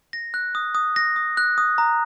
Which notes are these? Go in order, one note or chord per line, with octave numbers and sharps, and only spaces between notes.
A#6
F#6
D#6
D#6
A#6
D#6
F#6
D#6
A#5